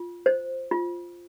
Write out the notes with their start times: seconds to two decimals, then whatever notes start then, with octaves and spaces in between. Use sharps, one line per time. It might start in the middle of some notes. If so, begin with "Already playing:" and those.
Already playing: F4
0.26 C5
0.71 F4